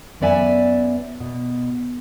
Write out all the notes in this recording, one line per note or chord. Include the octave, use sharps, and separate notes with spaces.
F#2 F#3 B3 D5 E5 G#5
B2